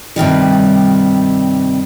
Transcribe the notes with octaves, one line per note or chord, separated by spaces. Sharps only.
G2 C3 D#3 G3